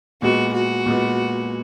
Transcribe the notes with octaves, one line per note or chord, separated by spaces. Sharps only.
A#2 G#3 B3 F#4
F#4
A#2 G#3 B3